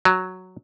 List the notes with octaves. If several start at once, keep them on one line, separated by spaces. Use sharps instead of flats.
F#3